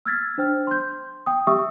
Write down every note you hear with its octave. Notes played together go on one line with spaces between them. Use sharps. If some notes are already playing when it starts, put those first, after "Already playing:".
E6 F6 G#6 A6 B6
D4 C5 G5 F6
C6 G6
G5 D#6
G4 E5 C#6 D#6 E6